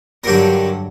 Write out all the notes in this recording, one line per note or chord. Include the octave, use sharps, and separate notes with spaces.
G2 D3 F#3 G4 A#4